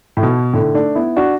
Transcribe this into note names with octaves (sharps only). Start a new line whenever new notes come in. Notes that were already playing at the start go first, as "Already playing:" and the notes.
A2
B2
A2 D3
A3 D4
B3 E4
D4 F#4